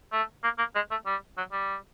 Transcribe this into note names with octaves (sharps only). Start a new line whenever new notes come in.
A3
A#3
A#3
G#3
A3
G3
F#3
G3